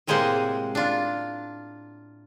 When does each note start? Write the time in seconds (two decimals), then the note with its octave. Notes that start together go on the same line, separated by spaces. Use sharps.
0.07 A2 C3 G#3 A#3 C5 F#5
0.75 D4 F4